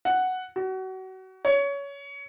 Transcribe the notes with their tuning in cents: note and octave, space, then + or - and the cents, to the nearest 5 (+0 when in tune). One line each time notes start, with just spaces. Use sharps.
F#5 +0
F#4 +30
C#5 +20